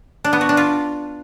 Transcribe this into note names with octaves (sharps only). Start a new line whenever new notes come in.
D4
B3
F#4
D4
F4